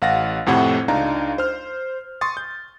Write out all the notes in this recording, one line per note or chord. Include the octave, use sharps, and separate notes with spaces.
A1 F5 F#5 A6 A#6
F2 A2 C3 F#5 G#6
C#2 D4 D#4 F5 A#5
C5 F6 G6
C6 C#6 D#6 A6
G6